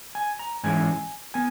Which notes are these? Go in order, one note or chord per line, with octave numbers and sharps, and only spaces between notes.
G#5
A#5
G#2 E3 G#3 C#4 E4 G#5
B3 G#5